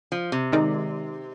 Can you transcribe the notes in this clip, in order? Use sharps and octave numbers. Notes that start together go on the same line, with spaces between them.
F3
C3
D#3 G#3 D#4 A#4 D5